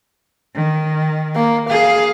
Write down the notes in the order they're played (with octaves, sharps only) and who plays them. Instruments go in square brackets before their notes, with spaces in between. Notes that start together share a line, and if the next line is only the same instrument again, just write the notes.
[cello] D#3
[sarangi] A#3
[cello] G#4 [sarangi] F5